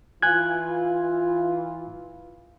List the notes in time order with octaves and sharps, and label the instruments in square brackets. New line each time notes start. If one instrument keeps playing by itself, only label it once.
[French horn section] E3 F4 [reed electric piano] G#5 F#6 G#6